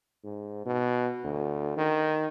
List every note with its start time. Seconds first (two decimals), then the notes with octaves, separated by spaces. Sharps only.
0.24 G#2
0.66 B2
1.24 D2
1.77 D#3